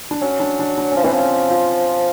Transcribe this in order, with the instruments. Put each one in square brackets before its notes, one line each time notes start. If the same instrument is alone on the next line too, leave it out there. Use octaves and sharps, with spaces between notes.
[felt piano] D4
[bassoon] F#3 [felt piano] C#4
[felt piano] D4
D4
D4
[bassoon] F3 [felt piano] C#4
[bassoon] E3 [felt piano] C4
[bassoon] F3
[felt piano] C#4
F4